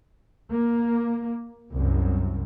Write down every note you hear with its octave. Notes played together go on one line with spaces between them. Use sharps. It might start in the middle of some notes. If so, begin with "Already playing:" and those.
A#3
C2 F#2